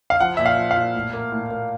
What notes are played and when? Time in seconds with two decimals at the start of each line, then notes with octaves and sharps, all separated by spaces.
0.10 F5
0.20 F3 F#5
0.37 A#2 E5
0.46 F5
0.57 F3
0.71 F5
0.77 A#2
0.94 A2
1.13 A#3
1.32 A2
1.51 A#3